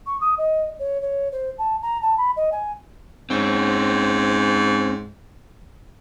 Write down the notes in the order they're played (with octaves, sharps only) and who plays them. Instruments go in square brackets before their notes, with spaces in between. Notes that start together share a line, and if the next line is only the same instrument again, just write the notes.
[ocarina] C#6
D#6
D#5
C#5
C#5
C5
A5
A#5
A5
B5
D#5
G#5
[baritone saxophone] G#2 [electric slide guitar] C4 C#4